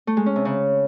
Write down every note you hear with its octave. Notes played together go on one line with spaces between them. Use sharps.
A3
G#3
C#4
C3
C#3